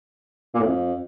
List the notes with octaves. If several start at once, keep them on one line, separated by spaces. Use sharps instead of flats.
A#2
A2
F2